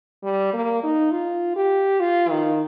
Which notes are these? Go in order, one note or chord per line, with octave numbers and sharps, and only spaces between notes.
G3
A#3
D#4
F4
G4
F4
D#3